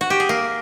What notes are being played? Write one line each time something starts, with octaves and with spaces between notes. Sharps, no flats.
F#4
G4
G#4
A#3